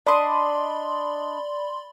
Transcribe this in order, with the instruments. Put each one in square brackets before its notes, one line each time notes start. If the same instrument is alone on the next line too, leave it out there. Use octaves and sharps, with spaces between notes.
[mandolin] D4 D#5 [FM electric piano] D5 B5 C6